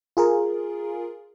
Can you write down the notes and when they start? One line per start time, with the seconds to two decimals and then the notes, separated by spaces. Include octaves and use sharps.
0.17 F4 G#4 A#4